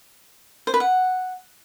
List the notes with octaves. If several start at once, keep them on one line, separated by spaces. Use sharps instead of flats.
C5
B4
F#5